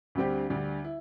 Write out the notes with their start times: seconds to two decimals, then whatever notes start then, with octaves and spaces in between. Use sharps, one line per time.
0.15 D2 D3 G3 C4 G4
0.50 D2 D3 G3
0.84 E4